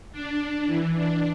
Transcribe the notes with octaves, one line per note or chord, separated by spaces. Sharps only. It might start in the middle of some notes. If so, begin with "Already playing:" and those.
D4
E3
D4